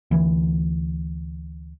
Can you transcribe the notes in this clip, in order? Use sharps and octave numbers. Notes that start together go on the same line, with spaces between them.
D2 E3